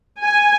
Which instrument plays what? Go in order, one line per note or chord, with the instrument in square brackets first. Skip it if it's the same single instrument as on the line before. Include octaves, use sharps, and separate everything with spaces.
[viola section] G#5